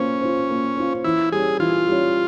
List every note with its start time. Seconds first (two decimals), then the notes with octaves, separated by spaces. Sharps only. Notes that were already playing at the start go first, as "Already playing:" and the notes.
Already playing: A#3 C#4 F4 C5
0.21 F4 C5
0.50 A#3
0.77 F4 C5
1.04 E3 E4
1.32 G3 C#4 G#4
1.59 E3 F4
1.87 G3 C#4